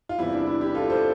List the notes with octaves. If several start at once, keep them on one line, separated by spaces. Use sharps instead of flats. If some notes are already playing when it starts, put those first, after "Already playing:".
F4
E2 C3 E3 G3 E4
D4
E4
E4 G4
F4 A4
A4 C5